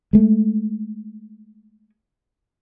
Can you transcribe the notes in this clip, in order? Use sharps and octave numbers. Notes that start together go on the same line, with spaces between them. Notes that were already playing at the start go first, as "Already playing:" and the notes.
G#3 A3